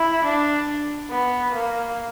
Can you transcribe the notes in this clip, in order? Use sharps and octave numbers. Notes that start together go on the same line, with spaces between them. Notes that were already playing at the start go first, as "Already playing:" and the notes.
Already playing: E4
D4
B3
A#3